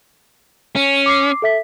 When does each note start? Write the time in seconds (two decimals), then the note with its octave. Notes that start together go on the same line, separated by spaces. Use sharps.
0.76 C#4
1.06 D6 C7
1.42 A4 E5 B6